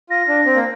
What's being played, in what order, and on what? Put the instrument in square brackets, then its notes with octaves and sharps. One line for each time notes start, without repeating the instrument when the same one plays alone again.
[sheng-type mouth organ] F4 [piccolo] A#6
[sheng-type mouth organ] D4
C4
A#3